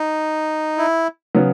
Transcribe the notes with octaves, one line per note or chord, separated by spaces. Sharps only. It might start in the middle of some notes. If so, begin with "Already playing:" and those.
Already playing: D#4
E4
C#3 F#3 B3